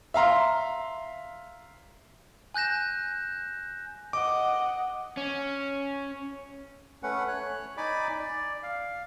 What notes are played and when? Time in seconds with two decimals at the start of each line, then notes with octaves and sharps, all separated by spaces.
0.14 E5 F5 A#5 C6
2.54 G#5 F#6 G6 A#6 E7
4.13 D#5 F#5 D6
5.17 C#4
7.03 A3 C#4 B4 F#5
7.28 C#5 F#6
7.77 D#4 D5 G#5 B5 D6
8.19 D5
8.63 F5